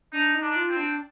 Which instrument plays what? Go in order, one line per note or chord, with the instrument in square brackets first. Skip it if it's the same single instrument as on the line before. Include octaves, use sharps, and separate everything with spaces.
[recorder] D4 [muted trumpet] D#4
[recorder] D#4
[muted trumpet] D4
[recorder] F4
[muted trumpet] C4
[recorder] D4